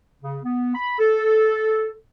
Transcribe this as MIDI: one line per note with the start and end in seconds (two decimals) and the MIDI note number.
0.22 0.36 49
0.43 0.74 59
0.75 0.95 83
0.99 1.96 69